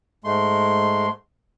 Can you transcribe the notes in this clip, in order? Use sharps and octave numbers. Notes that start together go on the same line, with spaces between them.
G#2 G#3 A3 C6